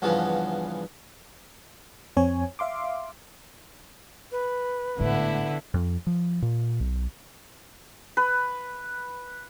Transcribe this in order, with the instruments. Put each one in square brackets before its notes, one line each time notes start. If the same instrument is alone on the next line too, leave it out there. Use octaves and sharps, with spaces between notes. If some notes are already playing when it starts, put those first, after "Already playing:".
[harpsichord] E2 G2 C#3 F3 B3
[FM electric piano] F2 C4 C#5 G#5
E5 F5 C6 D6
[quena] B4
[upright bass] G#1 A2 [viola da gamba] D3 [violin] B3 E4
[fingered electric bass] F2
F3
A#2
B1
[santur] B4